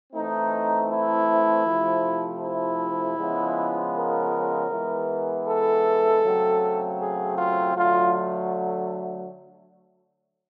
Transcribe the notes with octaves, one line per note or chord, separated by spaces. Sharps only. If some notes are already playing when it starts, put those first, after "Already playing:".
E3 A3 C4 D#4
E4
C3 F3 A3
E4
C#3 F3 G#3 B3
A#4
E3 G#3 B3
A4
C#3 F#3 A3 C4
G#4
F4
D3 F#3 A3 F4